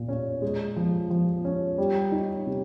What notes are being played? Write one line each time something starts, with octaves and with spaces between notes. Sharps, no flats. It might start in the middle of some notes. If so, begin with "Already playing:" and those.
Already playing: A#2
C#4
G#3
F3
F3
C#4
G3
D#4
C3